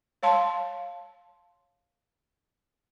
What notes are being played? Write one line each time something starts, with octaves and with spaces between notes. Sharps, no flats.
C#5 F5 A5 C6